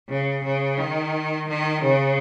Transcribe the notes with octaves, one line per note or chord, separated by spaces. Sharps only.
C#3
C#3
D#3
D#3
C#3